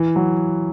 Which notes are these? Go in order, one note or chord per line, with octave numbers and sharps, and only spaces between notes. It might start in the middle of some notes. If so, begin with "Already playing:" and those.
Already playing: E3
F#3